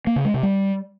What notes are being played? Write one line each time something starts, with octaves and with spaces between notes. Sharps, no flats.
A#3
C#3
G#3
C3
G3